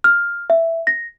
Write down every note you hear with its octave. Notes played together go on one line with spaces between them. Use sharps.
F6
E5
A#6